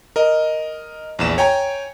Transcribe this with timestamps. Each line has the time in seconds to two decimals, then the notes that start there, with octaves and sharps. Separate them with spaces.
0.16 A#4 D#5
1.19 A#1 E2 E7
1.38 C#5 G5 G#5 A#5